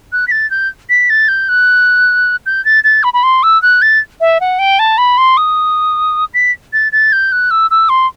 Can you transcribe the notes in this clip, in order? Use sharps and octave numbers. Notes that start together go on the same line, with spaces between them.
F#6
B6
A6
G6
B6
A6
G6
F#6
G6
A6
A6
B5
B5
C6
E6
F#6
A6
E5
F#5
G5
A5
B5
C6
D#6
B6
A6
A6
G6
F#6
E6
E6
C6